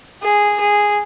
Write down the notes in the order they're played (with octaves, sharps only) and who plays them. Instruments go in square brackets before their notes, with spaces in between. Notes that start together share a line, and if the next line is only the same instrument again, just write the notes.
[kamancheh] G#4
G#4